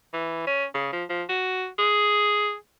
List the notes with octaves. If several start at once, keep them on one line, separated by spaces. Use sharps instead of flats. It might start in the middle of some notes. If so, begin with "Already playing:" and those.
E3
C#4
C#3
F3
F3
F#4
G#4